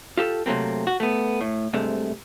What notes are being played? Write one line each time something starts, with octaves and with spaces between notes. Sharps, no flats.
F4 G4 A4
C3 F#3 A3 A#3 C4
F#4
A3 B3
A2
C2 G2 C3 G#3 A3